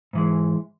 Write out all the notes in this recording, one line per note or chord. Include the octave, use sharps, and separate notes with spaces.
G#2 E3 G#3